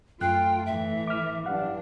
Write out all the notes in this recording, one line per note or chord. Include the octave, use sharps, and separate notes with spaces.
F#2 A3 F4 G5 F#6
A2 E3 E5
D6 F6
G2 E3 F#3 D4 F5 F#5